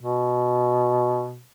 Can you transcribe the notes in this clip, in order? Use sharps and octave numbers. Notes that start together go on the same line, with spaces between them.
B2